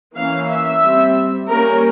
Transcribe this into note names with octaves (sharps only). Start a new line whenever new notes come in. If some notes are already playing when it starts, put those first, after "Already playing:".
E3 A#3 C#4 F5
E5
G3 C4
G3 A#3 C#4 A#4